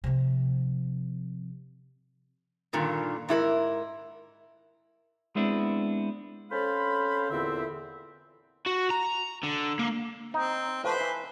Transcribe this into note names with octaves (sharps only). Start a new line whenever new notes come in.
C3 F3
G2 A#2 D3 D#3
G#2 E4 A4 A#4
G#3 B3 C4 D4 E4
C4 C#4 A4 C5 F5 B5
E2 A#2 D3 C4 E5
F#4
A#5
D3
A#3
C4 D#4
A2 F3 B4 C5
E3